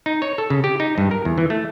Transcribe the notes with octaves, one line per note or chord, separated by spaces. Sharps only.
D#4
C#5
A4
C#3
G4
D#4
G2
A#4
E2
E3
A3